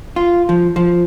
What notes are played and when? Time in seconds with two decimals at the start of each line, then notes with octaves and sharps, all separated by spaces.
0.16 F4
0.49 F3
0.76 F3